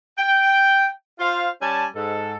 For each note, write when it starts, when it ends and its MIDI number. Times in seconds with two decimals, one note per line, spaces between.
0.18 0.86 79
1.19 1.49 65
1.19 1.49 72
1.19 1.49 77
1.62 1.86 55
1.62 1.86 61
1.62 1.86 80
1.62 1.86 81
1.96 2.35 44
1.96 2.35 69